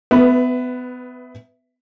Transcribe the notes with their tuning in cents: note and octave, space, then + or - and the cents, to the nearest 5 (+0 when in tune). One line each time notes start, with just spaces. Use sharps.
B3 +25 B4 +0 E5 +0